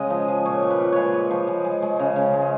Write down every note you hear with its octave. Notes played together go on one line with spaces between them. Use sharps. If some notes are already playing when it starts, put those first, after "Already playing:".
Already playing: C#3 G#3 D#5
F3
F3
A#2 C#5
A#2
B4
A#2
G#3 B4 C#5
G#3
F3
G#3
G#3
G#3
C#3
C#3
G#3